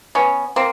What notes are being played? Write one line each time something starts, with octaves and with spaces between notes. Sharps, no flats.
B3 C#4
A#3 C4